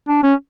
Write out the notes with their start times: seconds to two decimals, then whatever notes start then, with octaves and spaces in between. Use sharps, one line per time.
0.08 D4
0.23 C#4